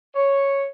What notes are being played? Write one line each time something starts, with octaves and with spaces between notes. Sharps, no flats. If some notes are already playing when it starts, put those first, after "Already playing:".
C#5